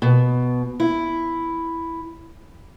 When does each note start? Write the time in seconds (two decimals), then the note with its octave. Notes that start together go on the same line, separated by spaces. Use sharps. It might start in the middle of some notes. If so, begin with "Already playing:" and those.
0.02 B2
0.80 E4